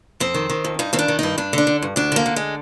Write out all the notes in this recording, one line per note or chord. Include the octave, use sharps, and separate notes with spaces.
F2 C4
D#3
D#3
F2
G2 D#4
D#3 C4
D4
D#3
G2 D#4
G2 D4
D3 D4
D3
G2
D2 D4
D3 A#3
D3
G#3